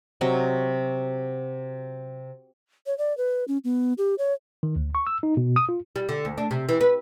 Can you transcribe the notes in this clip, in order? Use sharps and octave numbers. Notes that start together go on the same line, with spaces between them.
C3 F#3 D#5
C#5
D5
B4
C#4
B3
G4
C#5
D#3
D2
C#6
E6
D#4
B2
D#6
F4
G3
D3
D2
D4
C3
E3
B4